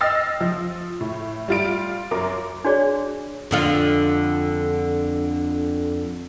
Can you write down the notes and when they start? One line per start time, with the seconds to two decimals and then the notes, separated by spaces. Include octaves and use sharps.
0.01 D#5 G5 E6 F6 A6 C7
0.41 F3
1.00 A2
1.48 G3 F4 D7
2.11 F#2 A#4 D6
2.65 D4 F#4 G#4 C#5 D5
3.51 F2 D3 F4